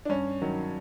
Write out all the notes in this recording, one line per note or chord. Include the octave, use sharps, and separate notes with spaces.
D4
G2 C#4
D#3 F#3